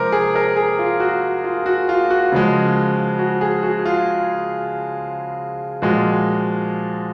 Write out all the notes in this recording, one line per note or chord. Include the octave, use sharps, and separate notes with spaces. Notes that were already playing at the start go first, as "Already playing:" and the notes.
Already playing: C3 F3 G#3 A#4 C5
G#4
A#4
G#4
F4
F#4
F4
F#4
F4
F#4
C#3 F3 G#3
F#4
G#4
F#4
F4
A#2 F3 G#3 F#4